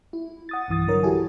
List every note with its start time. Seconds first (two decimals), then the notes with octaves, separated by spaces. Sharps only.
0.13 E4
0.49 F#5 D#6 A6
0.68 B1 G2 E3 D#6 A6
0.88 D3 F#3 A#4 C#5
1.03 E4 F#4 G4 A4 G#5